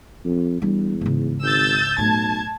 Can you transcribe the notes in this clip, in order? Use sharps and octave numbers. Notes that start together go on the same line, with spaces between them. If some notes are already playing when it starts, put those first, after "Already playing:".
F2
E2 G3 D4
G#2 C#3
G#1 E6 G6 A6
B1 A2 A5 G#6